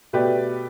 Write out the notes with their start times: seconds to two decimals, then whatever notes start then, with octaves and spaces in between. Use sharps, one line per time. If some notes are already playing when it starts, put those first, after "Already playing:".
0.13 B2 A3 G4 B4 D5